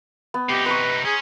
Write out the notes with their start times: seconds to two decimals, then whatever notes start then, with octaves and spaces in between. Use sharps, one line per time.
0.34 B3
0.49 C3 D#4 G4
0.66 B4 C5 A#5 C#6
1.05 C#4 G#4